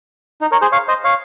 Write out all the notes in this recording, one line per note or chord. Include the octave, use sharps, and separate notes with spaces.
D#4
A#4 C#5
G#4 C5
C#5 F5
C5 D#5
C#5 F5